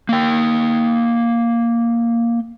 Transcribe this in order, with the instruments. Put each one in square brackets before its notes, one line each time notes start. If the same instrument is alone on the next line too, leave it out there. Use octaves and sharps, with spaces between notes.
[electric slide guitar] A#3 G5